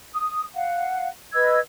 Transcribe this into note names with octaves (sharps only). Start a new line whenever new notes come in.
D#6
F5 F#5
B4 D#5 E6 G#6